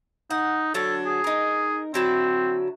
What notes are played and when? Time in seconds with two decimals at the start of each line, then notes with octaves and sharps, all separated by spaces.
0.30 D#4 F#5
0.74 D3 F#3 D4 A4
1.05 G#4
1.24 D#4 A#4
1.94 D3 F#3 C4 E4